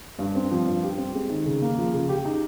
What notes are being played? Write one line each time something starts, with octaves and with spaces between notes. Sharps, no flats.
G2
C4
F3
G2
G4
C4
G#3
D#3
C#3
A#3
F3
C#3
G4
D#4